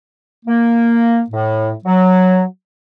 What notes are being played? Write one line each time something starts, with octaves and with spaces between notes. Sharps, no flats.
A#3
A2
F#3